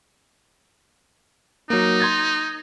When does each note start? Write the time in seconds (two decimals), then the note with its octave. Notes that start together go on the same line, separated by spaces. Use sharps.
1.70 F#3 A#3 D#4
2.00 C6 G#6 A6